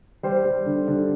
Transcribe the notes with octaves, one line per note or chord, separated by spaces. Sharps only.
G3 C5
G3
D3
D3